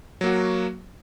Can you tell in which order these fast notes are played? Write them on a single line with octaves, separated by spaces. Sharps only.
F#3 A#3 F#4